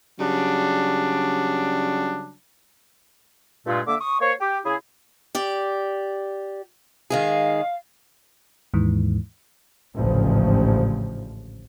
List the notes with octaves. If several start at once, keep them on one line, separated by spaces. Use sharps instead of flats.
C#3 F#3 G3 D4
G2 A#2 G#3 A3 F4
D3 A#3 E5 D6
C#6 D#6
A#3 C5 C#5
G4
C#3 E4 G#4
G4 D5
D#3 G#3 G#4 F5
D#2 G#2 E3
A1 D2 G#2 C#3 F3